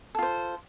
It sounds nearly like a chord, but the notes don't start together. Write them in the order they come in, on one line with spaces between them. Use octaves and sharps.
A4 F4 C5